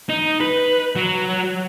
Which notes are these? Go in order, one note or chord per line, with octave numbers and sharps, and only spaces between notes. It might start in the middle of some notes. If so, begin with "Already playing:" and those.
D#4
B4
F#3